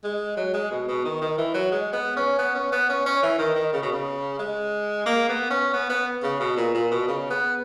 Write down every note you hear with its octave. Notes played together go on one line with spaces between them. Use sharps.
G#3
F#3
G#3
B2
B2
D#3
D#3
E3
F#3
G#3
B3
C#4
B3
C#4
B3
C#4
C#4
E3
D#3
D#3
C#3
B2
C#3
G#3
A#3
B3
C#4
B3
B3
C#3
B2
A#2
A#2
B2
C#3
B3